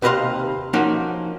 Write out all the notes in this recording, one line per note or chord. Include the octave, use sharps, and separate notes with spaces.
D#2 C3 B4 D#5 F5 C6
F3 A#3 C#4 D#4 F#4